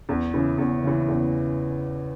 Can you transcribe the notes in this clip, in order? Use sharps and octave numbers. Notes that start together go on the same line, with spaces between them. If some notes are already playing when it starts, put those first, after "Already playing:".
E2
C#3 E3
E2
C#3 E3
E2